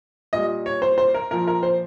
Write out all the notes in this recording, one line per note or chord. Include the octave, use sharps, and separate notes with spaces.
A#2 G3 D#5
C#5
C5
C5
A#4
A#2 F3 A#4
A#4
C5